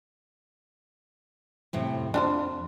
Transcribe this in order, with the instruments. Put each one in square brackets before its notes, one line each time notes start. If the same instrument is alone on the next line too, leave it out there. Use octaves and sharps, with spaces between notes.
[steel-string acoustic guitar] F2 A2 C3
[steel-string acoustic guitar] F2 [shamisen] D4 F4 C5